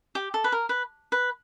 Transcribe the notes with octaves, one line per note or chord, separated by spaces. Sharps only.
G4
A4
B4
A#4
B4
B4